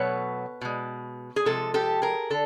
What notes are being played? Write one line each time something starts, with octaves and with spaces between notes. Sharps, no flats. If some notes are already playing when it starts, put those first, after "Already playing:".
Already playing: B2 F#3 A3 B4 C#5
B2 G#3
G#4
C3 F3 G#3 A4
G4 A4
G#4 A#4
D3 A4